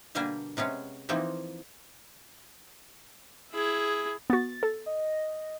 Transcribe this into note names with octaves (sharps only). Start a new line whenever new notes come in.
B2 D3 G3 A#3 D4 G#5
C3 G#3 B3 C#4
E3 F3 A#3 C4 D#4
E4 G#4
B3 F#4 A6
A4
D#5